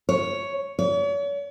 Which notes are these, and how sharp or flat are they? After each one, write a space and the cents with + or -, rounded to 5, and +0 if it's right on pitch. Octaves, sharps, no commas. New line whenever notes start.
C#5 +5
C#5 +40